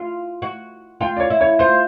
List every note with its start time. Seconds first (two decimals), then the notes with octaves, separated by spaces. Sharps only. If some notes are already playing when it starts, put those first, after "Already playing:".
Already playing: F4
0.42 F#4
1.01 F4 G5
1.17 D5
1.20 C#5
1.30 E4
1.41 C#5
1.59 F4 C5